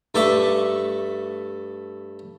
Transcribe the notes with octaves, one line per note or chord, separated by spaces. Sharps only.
G2 A3 E5 C#6 D6